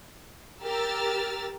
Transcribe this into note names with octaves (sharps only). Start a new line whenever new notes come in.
G4 A#4 E6 F6 A6